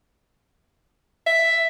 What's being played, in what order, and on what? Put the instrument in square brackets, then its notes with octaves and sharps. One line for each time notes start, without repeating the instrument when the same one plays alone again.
[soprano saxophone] E5